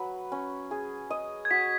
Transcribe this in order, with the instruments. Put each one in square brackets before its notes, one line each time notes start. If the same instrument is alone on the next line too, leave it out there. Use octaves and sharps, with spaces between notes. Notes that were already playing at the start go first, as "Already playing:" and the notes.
Already playing: [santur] F#3 B4
C#4
G#4
D#5
[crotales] G#6
[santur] F#4 [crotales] B6